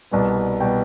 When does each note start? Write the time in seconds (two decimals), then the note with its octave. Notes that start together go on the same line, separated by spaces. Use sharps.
0.11 C2 B2 G3 B3
0.60 B2 G3 B3 G5